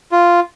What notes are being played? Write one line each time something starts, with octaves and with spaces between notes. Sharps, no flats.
F4